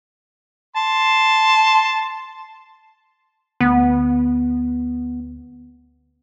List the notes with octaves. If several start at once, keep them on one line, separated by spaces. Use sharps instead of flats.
A5 C6
D2 B3